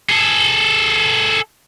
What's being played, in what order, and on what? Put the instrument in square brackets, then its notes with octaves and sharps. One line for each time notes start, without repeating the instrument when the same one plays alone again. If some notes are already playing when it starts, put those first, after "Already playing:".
[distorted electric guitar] G#4 A4